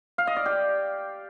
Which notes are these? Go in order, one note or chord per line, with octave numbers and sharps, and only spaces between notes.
F5
D#5
D5
G4